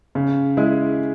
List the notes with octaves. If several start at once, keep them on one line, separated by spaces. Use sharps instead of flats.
C#3
G#3 E4 G#4